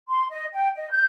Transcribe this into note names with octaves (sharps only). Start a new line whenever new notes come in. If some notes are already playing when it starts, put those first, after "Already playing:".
C6
D#5
G5
D#5
G6